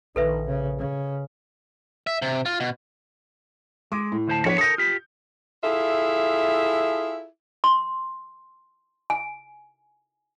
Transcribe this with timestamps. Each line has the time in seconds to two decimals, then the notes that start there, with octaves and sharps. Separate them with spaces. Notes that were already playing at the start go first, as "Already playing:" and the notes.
0.16 A#1 D#3 A4 B4 E5
0.46 C#3
0.78 C#3
2.07 E5
2.22 C3
2.46 F4
2.60 B2
3.92 G#3 D6
4.12 A2
4.28 D2 C5 A5
4.45 F3 B3 D4 C#5 D5
4.58 A4 A#4 D#6 G6
4.78 F4 G4
5.63 E4 F4 G#4 A4 E5
7.64 C6
9.10 G#5